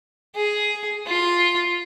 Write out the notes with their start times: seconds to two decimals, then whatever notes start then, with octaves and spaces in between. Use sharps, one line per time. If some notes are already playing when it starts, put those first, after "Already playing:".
0.35 G#4
1.07 F4